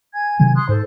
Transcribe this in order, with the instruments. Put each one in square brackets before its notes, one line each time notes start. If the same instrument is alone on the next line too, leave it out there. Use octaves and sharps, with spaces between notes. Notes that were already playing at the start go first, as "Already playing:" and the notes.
[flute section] G#5 G#6
[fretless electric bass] C3 D#3 F#3
[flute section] C6 D#6 F#6
[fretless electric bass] G#2 [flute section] A4 C5